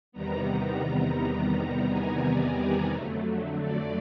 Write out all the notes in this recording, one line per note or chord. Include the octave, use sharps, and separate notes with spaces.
E2 C3 D#3 G3 B3 A#5
G#5
D5
F2 D3 F#3 A3
D5